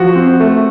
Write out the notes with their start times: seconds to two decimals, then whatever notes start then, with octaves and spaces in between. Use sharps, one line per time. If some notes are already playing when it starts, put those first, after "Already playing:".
Already playing: F3 F#4
0.15 C4
0.40 A3